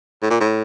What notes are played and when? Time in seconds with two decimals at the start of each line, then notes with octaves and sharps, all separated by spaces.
0.22 A2
0.31 A#2
0.40 A2